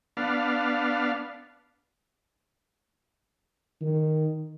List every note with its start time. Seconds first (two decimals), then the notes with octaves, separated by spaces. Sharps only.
0.17 B3 D4 F5
3.82 D#3